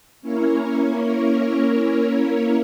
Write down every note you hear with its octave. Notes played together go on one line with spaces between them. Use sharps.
A#3 C#4 E4 A#4 C#5